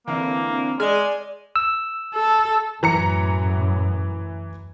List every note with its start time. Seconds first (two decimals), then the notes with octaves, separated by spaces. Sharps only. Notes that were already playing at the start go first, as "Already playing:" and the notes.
0.07 D3 E3 A#3 C4
0.49 C4
0.80 G#3 G#4 D5 G#5
1.56 E6
2.15 A4
2.83 F#2 A2 E3 A#5 C#7